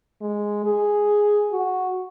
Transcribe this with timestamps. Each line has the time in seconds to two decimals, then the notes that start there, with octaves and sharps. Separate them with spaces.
0.21 G#3
0.64 G#4
1.52 F#4